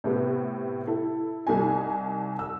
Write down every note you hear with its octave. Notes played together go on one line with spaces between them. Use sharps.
A2 C3 B3
E4 A4
C2 D#4 G#5
E6